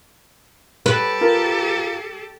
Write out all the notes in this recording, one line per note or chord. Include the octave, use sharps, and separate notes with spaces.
G4 A4 B4
F4 A#4